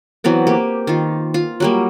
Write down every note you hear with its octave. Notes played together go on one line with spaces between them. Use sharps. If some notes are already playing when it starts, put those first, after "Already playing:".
E3 F#3 B3 C4
A#3 G4
D#3 F4
F4
F#3 G3 A#3